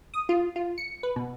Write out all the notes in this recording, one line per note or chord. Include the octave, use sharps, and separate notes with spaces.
D#6
F4
F4
C#7
B4
B2